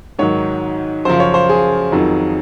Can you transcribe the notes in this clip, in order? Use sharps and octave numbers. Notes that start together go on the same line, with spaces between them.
G#2 D#3 F#3 C#5
F#2 C#3 F3 C5
C#5
C5
G#4
F2 D#3 F#3